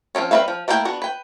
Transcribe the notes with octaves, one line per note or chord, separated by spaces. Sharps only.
F3 F#3 C4 C#4
G3 C4 B4 E5 F5
F3
A3 A#3 E4 G#4 G5
B3 D4 F#4
B4 G5